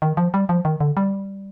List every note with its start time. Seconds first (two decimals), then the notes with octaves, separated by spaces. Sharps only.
0.02 D#3
0.17 F3
0.34 G3
0.49 F3
0.65 D#3
0.80 D3
0.97 G3